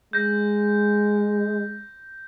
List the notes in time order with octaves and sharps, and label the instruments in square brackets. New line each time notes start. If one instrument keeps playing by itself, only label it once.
[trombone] G#3 [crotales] G6 A#6